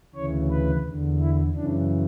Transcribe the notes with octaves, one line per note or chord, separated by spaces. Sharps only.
D2 C#3 E3 C#5
B4
E2 D3
E4
F#2 C#3 E3 D4